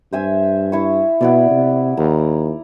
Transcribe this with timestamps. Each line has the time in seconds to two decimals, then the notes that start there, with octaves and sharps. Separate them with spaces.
0.13 G2 C5 E5 G#5
0.72 E4 C#6
1.21 B2 B3 E4 D5
1.50 C3
1.97 D#2 A#5